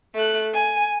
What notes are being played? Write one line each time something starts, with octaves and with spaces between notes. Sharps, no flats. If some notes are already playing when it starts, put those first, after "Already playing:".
A3 F#6
G#5